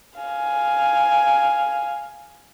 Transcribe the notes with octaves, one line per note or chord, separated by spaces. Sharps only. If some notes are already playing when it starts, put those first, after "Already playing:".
F5 G#5